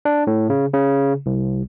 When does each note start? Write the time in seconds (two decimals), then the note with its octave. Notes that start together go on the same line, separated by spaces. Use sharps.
0.05 D4
0.27 A2
0.50 C#3
0.74 C#3
1.26 C2